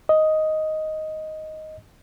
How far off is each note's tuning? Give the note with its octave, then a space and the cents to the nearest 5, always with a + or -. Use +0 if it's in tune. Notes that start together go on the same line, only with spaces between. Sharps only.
D#5 +5